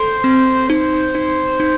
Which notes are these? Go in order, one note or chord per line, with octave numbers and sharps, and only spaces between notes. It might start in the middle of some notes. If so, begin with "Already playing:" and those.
Already playing: A4 C5
C4
D#4 C5
D#4
D#4